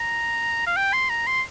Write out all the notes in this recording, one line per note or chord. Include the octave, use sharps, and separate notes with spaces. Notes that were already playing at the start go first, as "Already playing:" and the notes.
Already playing: A#5
F5
G5
C6
A#5
C6